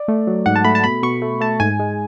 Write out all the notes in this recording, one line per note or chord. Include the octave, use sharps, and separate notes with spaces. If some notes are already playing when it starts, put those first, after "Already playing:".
Already playing: D5
A3
F#3
G#2 F#5
A5
A3 B5
A5
B2 B5
B2 C#6
A3
A3 A5
G#2 G#5
G#3